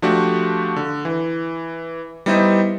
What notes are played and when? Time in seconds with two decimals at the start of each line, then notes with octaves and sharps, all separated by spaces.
0.02 F3 A3 D4 F#4 G4
0.76 D3
1.05 E3
2.26 G3 B3 D#4 E4 C5 D#5